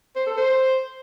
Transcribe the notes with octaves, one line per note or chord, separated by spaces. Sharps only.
C5
A4
C5